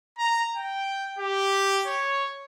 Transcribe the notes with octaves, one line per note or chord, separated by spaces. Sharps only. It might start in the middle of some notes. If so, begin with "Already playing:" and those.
A#5
G5
G4
C#5